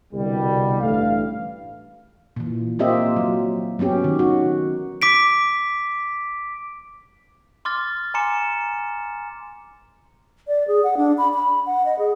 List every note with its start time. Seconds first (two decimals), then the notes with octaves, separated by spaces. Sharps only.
0.13 C2 B2 D3 G3
0.81 A1 G2 A3 F5
2.36 A#2 E3
2.79 A#3 C4 F4 G4 D#5 E5
3.16 F#3
3.79 F#3 B3 C#4 G4
4.04 D#3
4.19 F#4
5.02 D6 B6 D7
7.65 C6 D6 F6 A6
8.14 G#5 A#5 C6 D6 C#7 E7
10.48 D5
10.68 G#4
10.84 F#5
10.97 D4
11.18 B5
11.34 B5
11.66 F#5
11.85 D#5
11.99 G#4